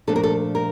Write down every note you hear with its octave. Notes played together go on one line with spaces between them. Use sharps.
A#2 F3 A3 D4 A4
A#4
A4
A#4